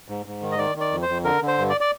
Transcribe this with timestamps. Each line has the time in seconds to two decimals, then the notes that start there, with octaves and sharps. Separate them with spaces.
0.08 G#2
0.26 G#2
0.42 D#3
0.52 D#5
0.58 D#3 D5
0.76 D#3 D5
0.92 F2
1.03 C5
1.09 F2
1.24 D3 A#4
1.42 D3
1.48 C5
1.58 G2
1.69 D5
1.81 D5